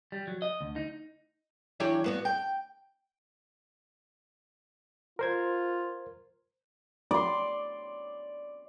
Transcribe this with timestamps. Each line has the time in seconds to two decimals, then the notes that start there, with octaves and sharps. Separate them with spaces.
0.12 G3
0.28 F#3
0.42 D#5
0.61 D2
0.76 D#4
1.80 E3 F#3 D4 G4 C#5
2.04 G2 B3 F#4
2.25 G5
5.19 F4 A#4 C5 G#6
7.11 D5 C6